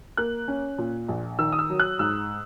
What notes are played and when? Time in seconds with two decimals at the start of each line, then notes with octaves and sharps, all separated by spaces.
0.17 A#3 F#6
0.48 C#4
0.78 A#2
1.08 A#1
1.39 D#3 E6
1.52 D#6
1.59 E6
1.70 F#3
1.80 F#6
1.99 G#2 E6